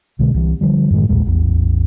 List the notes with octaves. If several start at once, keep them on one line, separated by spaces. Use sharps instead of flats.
C2 B2 D3 G#3
C2 E3
D3 F3 G3
F#2 A2 D#3 G#3
A1 D#2 A#2 G#3
A1 E2